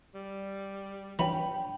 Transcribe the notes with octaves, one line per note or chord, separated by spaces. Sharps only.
G3
E3 C#4 D4 G5 B5